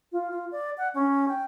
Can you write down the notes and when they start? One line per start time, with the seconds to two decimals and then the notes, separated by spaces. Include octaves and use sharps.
0.12 F4
0.31 F4
0.52 D5
0.78 F#5
0.94 C#4
1.28 G5